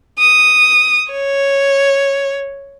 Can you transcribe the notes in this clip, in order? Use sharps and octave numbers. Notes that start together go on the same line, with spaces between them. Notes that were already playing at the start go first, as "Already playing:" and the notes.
D#6
C#5